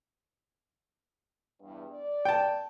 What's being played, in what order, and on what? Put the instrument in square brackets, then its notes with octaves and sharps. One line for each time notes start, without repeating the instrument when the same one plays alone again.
[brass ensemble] E2 G2
D5
[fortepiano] G5 A5